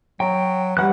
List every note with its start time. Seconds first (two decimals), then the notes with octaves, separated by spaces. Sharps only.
0.20 F#3 G5
0.77 E3 G3 F#5 F#6